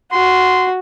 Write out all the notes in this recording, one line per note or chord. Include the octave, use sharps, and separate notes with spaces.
F#4 C6